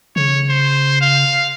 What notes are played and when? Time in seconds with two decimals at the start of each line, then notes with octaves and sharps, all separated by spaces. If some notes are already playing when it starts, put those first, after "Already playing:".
0.16 C#3 C#5
0.50 C5
1.01 F5